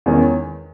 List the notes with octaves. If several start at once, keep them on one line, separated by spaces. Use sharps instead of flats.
E2 D#3 G#3 C#4